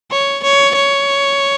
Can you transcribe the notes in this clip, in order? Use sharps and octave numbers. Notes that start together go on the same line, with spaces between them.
C#5
C#5
C#5